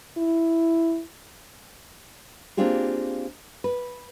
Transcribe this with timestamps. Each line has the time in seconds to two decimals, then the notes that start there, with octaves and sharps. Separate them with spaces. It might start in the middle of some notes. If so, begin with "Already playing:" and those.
0.17 E4
2.57 A#3 C4 D4 F4 G4 G#4
3.64 B4